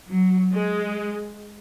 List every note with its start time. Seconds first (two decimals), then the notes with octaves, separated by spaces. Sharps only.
0.09 F#3
0.51 G#3